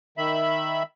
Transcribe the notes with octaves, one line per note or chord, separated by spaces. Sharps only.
D#3 E5 B5